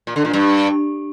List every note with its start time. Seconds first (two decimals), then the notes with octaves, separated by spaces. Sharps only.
0.07 A#2
0.16 D3
0.25 A#2
0.33 G2